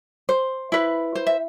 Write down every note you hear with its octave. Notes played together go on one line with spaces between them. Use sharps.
C5
E4 B4
C5
E5